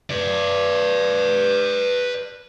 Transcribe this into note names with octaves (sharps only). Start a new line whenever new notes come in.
B4 D5